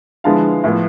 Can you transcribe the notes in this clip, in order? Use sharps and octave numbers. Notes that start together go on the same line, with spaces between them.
D3 F3 G#3 B3 E4 F5 A5
A2 F3 B3